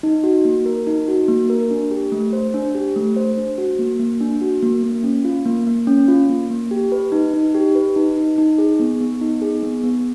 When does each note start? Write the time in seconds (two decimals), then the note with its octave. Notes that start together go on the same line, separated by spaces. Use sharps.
0.03 D#4
0.24 F#4
0.45 A#3
0.66 A#4
0.87 D#4
1.08 F#4
1.28 A#3
1.50 A#4
1.70 D4
1.91 G4
2.12 A3
2.33 C5
2.54 D4
2.75 G4
2.96 A3
3.16 C5
3.37 D4
3.58 F#4
3.79 A#3
4.00 A#3
4.21 D4
4.41 F#4
4.63 A#3
4.83 A#3
5.04 C#4
5.25 F4
5.46 A#3
5.67 A#3
5.87 C#4
6.08 F4
6.29 A#3
6.50 A#3
6.71 G4
6.92 B4
7.12 D#4
7.34 D#4
7.54 G4
7.75 B4
7.96 D#4
8.17 D#4
8.38 D#4
8.58 G#4
8.80 B3
9.00 B3
9.21 D#4
9.42 G#4
9.63 B3
9.83 B3